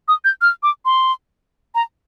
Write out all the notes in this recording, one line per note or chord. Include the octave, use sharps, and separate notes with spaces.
D#6
G6
F6
D6
C6
A#5